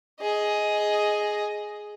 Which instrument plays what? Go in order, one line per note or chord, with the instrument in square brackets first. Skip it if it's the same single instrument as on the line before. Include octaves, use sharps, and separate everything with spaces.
[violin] G#4 D#5